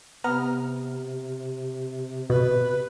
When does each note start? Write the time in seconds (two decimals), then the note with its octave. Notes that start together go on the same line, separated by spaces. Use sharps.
0.24 C3 B3 A#5 F6
2.30 B2 B4